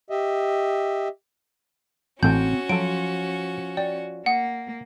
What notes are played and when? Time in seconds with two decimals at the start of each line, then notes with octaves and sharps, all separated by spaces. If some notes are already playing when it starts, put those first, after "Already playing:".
0.10 G4 D#5 E5
2.23 A1 C4 C#4 F#4 A4 G5 G#5 G6
2.69 F3 F#3 A4 D7
3.77 D5 G5
4.26 A#3 F#5